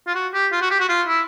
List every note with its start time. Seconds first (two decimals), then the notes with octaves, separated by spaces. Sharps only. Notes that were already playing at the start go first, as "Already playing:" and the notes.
0.07 F4
0.15 F#4
0.33 G4
0.52 F4
0.62 F#4
0.71 G4
0.80 F#4
0.89 F4
1.07 E4